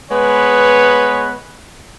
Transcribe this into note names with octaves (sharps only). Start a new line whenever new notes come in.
G#3 B3 B4 C#5